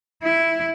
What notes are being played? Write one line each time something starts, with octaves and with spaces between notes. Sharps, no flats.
E4